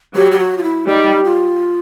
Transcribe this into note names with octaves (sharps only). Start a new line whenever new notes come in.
F#3 G4
G4
F#4
F4
E4
G3 D#4
F4